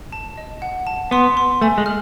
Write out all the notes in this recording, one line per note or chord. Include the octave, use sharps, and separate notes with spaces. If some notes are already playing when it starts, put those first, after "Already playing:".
A5
D#5
F#5
A5
B3 C6
C6
A3 G#5
G#3
F6